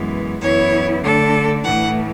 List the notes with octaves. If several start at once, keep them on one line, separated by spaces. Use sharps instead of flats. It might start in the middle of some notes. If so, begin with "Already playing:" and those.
Already playing: F#2 E3 G#3 B3
F#2 E3 B3 E4 C#5
D3 A3 D4 A4
A2 E3 A3 F#5